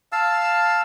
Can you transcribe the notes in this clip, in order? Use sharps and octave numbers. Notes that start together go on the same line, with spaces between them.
F5 A5 E6